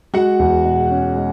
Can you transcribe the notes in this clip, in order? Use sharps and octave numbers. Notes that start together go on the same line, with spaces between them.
G#3 F#4 F#5
E2
B2
C#4
G#3